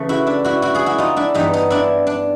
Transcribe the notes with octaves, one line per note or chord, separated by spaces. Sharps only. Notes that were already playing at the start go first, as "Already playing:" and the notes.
Already playing: C#3 E3 A3
E4 F#4
D4 E4
E4 F#4
E4 F#4
F#4 G#4
E4 F#4
D#4 F4
D4 E4
G2 E3 G3 B3 D#4
D#4
D4 E4
D4